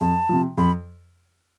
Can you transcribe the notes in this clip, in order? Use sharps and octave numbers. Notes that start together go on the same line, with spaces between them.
F2 A5
C3 F3
F2 B5